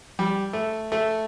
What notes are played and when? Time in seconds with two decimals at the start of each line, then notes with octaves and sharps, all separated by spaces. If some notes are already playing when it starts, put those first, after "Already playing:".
0.19 G3
0.53 A3
0.92 A3